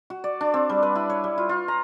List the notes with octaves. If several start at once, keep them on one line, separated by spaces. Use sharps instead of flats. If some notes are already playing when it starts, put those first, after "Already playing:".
F#4
D5
D4
C4
G3
B4
E4
C#5
G3
F4
F4
A#5